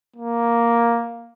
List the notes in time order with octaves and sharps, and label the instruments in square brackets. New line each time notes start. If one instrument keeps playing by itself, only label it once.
[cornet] A#3